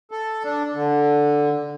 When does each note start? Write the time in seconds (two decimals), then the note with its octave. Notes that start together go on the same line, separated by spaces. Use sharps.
0.11 A4
0.44 D4
0.74 D3